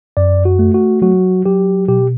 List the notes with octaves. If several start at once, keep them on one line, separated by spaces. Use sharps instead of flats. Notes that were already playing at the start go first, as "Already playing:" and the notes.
F#2 D5
F#4
A3
F#4
F#3 F#4
F#3 G4
B2 G4